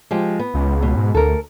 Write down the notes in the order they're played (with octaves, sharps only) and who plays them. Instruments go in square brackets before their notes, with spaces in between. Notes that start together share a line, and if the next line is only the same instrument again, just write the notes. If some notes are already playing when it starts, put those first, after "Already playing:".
[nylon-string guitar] F3 G#3 G4
B3
[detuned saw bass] C#2
[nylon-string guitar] B2
[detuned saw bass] G#2
[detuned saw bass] D2 [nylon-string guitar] A4 A#4